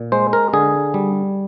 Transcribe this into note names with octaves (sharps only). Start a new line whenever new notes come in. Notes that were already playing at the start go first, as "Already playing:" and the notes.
Already playing: A#2
G#3 C5
A#4
D3 G#4
G3